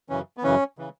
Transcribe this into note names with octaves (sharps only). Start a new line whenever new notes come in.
F#2 C#3 E3 C#4
B3
F#2 C#3 E3 C#4
C#3 E3